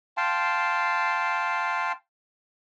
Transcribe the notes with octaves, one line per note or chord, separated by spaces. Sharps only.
F5 G5 A5 C6